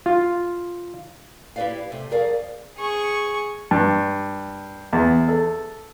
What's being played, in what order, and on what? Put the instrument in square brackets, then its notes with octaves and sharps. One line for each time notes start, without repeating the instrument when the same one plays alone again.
[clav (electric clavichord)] F4
[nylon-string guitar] E4 G4 G#4 B4 D5 F5
C3 A3
F2 G#4 A#4 D5 F5
[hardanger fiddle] G#4 C#6
[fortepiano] G2
E2
A4